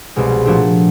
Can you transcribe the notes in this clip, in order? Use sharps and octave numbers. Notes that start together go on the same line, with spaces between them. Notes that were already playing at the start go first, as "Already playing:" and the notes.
C2 B2 G#3
A#2 F3 A3 D4 F#4